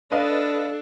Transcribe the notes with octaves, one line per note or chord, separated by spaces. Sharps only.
D4 A4 B4 D#5 F5